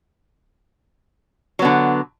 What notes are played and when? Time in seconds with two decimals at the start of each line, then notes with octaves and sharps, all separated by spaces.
1.59 F#3
1.62 B3
1.65 D3